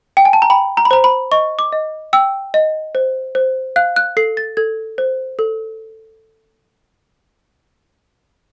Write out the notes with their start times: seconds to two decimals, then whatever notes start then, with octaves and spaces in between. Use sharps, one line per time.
0.17 G5
0.25 G#5
0.33 A5
0.42 A#5
0.50 G5 B5
0.77 A#5
0.85 B5
0.91 C5 A#5
1.04 B5
1.32 D#5 C#6
1.59 D6
1.73 D#5
2.13 G5 E6
2.54 D#5
2.95 C5
3.35 C5
3.76 F5 F#6
3.96 F#6
4.17 A4 C7
4.37 A6
4.57 A4 G#6
4.98 C5
5.39 A4